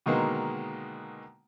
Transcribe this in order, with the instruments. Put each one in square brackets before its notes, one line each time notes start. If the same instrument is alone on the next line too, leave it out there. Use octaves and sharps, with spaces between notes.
[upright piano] B2 D3 D#3 G#3 A#3 B3